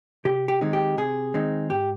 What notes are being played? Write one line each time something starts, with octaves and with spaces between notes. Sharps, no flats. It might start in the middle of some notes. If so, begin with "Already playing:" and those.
C3 G4
G4
D#3 G#3 C4 D#4
G4
C3 G#4
D#3 G#3 C4 D#4
G#2 G4